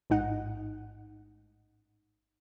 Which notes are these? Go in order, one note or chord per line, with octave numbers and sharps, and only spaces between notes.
A1 G#2 D#4 F#5